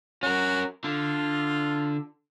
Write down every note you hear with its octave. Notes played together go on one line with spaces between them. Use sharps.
C#4 F#4 A#4
D3 F4